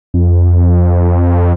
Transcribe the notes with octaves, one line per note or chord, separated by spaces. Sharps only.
F2